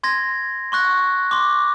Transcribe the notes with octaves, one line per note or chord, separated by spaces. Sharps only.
C6 G#6 A#6
C6 C#6 F#6 A#6
C6 D6